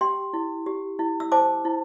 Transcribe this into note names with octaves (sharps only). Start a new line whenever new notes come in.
G4 G5 C6
E4
G4
E4
E6
C5 A5 D6
E4